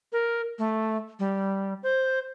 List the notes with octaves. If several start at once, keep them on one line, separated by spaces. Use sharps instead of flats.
A#4
A3
G3
C5